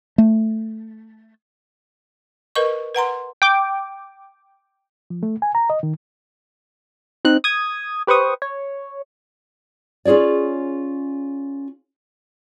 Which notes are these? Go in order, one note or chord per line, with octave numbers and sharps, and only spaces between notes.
A3
A#4 B4 D#5 C#6
B4 F#5 A#5 C6
G5 D6
F3
A3
G#5
A#5
D#5
D#3
C4 D#4 F#6
D#6 G#6
G4 B4 C5 C#6 D#6
C#5
C#4 F4 G#4 C#5 D5